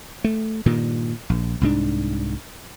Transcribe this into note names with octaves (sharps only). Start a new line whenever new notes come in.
A3
G2 A#2 D#3
A#1
C2 G#2 D4